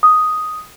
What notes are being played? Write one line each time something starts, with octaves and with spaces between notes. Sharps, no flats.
D#6